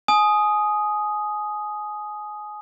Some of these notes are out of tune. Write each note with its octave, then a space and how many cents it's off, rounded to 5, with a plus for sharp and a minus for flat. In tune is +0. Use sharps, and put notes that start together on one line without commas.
G#5 +25 D#6 +0